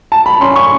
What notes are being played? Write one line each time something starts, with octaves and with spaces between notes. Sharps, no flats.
A5
B5
C#4 C6
C#6